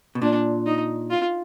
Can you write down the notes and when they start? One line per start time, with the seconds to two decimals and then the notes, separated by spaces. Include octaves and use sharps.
0.15 B2
0.22 A#2 D4
0.66 D#4
1.10 F4